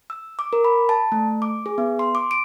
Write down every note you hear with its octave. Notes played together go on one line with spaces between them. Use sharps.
E6
D6
A#4
B5
A5
A3
D6
G#4
B3
C6
D6
D7